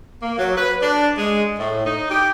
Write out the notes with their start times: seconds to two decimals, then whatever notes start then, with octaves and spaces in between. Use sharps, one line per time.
0.22 A#3
0.38 F#3
0.56 B4
0.81 D4
1.18 G#3
1.58 A2
1.85 D#4
2.10 G4